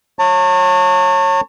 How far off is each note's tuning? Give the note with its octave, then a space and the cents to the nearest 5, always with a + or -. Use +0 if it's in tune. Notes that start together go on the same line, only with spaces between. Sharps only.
C#5 -20 A5 +40